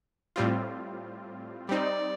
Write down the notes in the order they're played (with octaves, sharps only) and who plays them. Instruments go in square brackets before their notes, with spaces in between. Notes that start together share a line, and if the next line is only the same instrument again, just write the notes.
[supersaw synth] A2 G3 C4 F4
[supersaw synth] G3 C4 D#4 [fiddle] D5